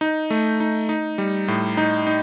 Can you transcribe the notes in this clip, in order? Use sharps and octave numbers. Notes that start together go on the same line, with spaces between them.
D#4
A3
D#4
D#4
G3
A2
D#4
D#4